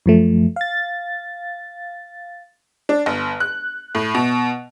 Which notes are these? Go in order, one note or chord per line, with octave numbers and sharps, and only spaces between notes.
F#2 F3 A3
F5 A6
D4
G1
F#6
A2
B2